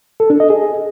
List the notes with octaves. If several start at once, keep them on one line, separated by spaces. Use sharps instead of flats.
A4
D4
D#5
G#4